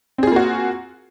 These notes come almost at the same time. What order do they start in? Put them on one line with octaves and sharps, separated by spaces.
C4 G#4 F4 A#3 F#4